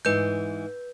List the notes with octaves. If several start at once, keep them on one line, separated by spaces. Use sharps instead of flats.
G#2 E3 B4 G6